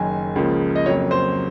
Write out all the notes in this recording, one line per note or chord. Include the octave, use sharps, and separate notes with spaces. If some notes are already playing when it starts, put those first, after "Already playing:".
Already playing: F#1 F#2 D#3 G#5
C#2 C#3 F3 A#3
D#5
F2 C#3 F#3 A#3 C#5
C5